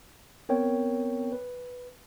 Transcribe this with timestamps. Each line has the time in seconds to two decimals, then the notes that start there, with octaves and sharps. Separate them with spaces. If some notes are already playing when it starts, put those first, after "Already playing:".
0.49 B3 C4 A#4 C#5 G5
1.32 B4